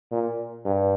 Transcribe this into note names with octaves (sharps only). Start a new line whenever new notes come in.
A#2
G2